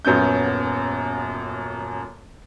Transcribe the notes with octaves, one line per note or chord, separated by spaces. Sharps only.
D#1 F#2 B3 C#4 G6